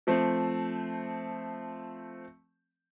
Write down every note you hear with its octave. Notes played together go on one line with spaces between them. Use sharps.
F3 A3 C4